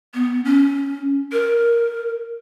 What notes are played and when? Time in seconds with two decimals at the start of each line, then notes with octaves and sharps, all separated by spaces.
0.14 B3
0.45 C#4
1.32 A#4